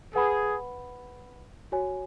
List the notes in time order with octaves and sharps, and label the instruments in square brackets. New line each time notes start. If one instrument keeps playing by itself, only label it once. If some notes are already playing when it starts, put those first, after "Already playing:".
[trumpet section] G#4 [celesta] B4 F#5 B5
[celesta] F#4 C#5 G#5